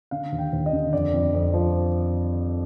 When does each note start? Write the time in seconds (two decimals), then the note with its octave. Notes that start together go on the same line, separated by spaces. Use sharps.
0.11 D3 F5
0.32 D#2
0.39 G5
0.53 D#2
0.66 D#5
0.73 D3
0.93 F2 D5
1.13 F2
1.34 F2
1.54 F3